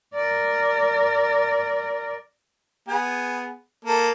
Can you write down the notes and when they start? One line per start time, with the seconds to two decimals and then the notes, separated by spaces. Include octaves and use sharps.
0.14 A#4 D5
2.88 B3 G#4
3.85 A#3 A4